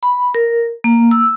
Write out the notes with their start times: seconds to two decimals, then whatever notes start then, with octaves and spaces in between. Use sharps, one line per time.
0.03 B5
0.35 A#4
0.84 A#3
1.11 E6